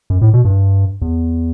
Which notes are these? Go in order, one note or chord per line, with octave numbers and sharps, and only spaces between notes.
F#2
A2
B2
G2
E2